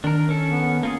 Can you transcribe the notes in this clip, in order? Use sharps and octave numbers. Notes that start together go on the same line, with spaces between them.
D#3 D4 A#4
C#4 A4
B3
A#3 F4 G#4